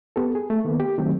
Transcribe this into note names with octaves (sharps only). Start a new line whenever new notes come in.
B3 G4 A4
G#4
A3
D#3 A#3 B3
G4
D#3 F#3 A3 C4